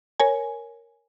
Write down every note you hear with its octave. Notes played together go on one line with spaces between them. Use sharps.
A#4 C#5 G#5